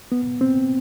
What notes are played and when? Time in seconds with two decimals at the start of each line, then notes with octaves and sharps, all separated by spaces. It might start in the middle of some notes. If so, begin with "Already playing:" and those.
0.12 B3
0.41 C4